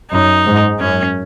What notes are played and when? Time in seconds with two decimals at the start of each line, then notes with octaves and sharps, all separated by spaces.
0.12 F#2 D#4
0.45 G#2
0.80 F#2 C#4